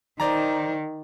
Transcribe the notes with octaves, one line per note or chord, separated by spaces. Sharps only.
D#3 C5 D5 A#5